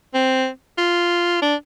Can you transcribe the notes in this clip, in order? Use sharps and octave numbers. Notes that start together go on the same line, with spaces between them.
C4
F4
D4